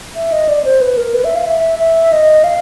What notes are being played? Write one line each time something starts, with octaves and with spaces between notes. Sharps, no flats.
E5
D#5
D5
C5
B4
A#4
B4
E5
F5
E5
E5
D#5
F5